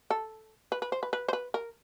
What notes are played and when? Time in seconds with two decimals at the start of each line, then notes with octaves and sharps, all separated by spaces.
0.11 A4
0.72 B4
0.82 B4
0.92 C5
1.03 B4
1.13 B4
1.28 C5
1.33 B4
1.54 A#4